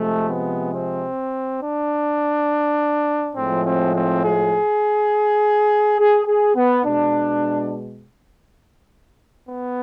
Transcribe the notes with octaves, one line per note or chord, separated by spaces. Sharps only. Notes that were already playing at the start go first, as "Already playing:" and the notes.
Already playing: C3 F3 G#3 A3
B3
C4
D4
A2 F3 G#3 C4
C4
C4
G#4
G#4
G#4
B3
B2 G#3 D4
B3